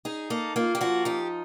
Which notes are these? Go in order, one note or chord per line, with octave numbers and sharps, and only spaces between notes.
D#4 G#4
A#3 A4
A#3 F4
G4
F3 F#4
D#4 G4